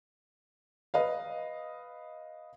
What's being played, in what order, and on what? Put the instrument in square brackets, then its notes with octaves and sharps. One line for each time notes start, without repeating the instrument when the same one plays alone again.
[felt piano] B4 D#5 F5